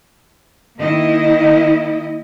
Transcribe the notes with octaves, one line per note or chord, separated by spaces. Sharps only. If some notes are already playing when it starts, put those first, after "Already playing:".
D#3 A#3 E4 D#5